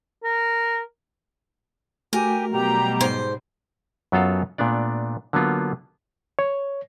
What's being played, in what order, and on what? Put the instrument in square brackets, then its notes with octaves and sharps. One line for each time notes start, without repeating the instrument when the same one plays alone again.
[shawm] A#4
[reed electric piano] A3 F#4 [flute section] G4 G#5 [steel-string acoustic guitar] A#4
[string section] B2 F#3 G3 [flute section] G4 A#5
[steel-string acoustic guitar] G#2 C5
[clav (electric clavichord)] F#2 F#3 B3 F4 A4 F5
A#2 A3 B3 D4 D5
D3 F#3 A#3 B3 F4
[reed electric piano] C#5